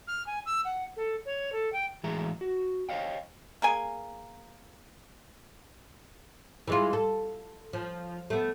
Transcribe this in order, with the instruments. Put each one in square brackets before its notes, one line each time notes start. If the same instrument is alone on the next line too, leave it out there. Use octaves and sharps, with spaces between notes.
[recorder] F6
G#5
E6
F#5
A4
C#5
A4
G5
[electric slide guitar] A2 E3 G#3 G#4 E5 A#5
F#4
C5 C#5 D#5 F5 G5
[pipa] A#3 G#4 G#5
[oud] E3 G#3 F4
A4
F3
A3 B3